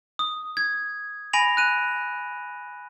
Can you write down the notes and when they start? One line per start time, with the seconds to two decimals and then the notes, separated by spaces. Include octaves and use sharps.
0.19 D#6
0.57 G#6
1.33 G#5 B5 A#6 D7 F7
1.57 F#6 D#7